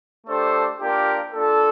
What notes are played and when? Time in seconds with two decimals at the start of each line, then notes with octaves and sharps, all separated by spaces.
0.27 A3 D4 G4 A4 C5
0.79 A#3 D4 F4 G4 A#4
1.34 A#3 D4 F4 A4